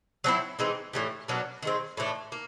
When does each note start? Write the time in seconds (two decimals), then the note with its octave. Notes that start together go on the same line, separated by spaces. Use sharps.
0.24 F#3 A3 C4 E4
0.59 E3 G#3 C4 D#4
0.93 A2 E3 G3
1.28 B2 F#3 A#3 D4
1.62 D#3 G#3 C4
1.97 A2 E3 A3 D4
2.32 A#3